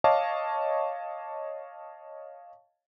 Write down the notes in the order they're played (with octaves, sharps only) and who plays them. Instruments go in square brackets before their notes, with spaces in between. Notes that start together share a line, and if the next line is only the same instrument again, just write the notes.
[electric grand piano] C#5 D#5 F5 A5 C#6 D6